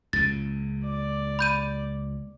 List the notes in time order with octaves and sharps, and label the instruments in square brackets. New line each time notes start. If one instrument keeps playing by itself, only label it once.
[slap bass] C#2 A#2 C#3 [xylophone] A6
[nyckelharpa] D5
[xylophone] B5 G6 D#7